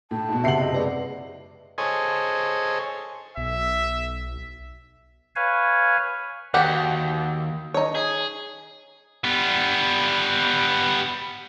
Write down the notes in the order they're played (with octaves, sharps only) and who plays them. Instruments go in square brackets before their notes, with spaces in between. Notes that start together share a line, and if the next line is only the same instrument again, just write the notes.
[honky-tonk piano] A2 [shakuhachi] A5
[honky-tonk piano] G#2 B2
[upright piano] F#1 C3 F#7 [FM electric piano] E5 F#5 [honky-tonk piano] G5 C7
[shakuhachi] D#5
[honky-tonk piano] G#3 [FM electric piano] B4 D5
[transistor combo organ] G#4 A4 C5 C#5 D#5 G#5
[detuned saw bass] B1 [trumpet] E5
[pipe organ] B4 C#5 F5 G#5
[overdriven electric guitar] D#2 [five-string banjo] F#4 G4 F#5
[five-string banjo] D#4 C#5
[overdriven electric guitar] G#4
[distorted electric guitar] G3 B3